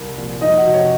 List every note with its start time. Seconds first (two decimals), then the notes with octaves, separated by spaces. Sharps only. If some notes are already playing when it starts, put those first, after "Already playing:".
Already playing: C2 A#4
0.17 A#2 F3
0.41 F2 D#4 D#5
0.57 F#4 F#5
0.66 C3 F3
0.74 C#5